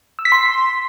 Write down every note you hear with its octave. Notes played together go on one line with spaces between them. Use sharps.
E6
B6
C6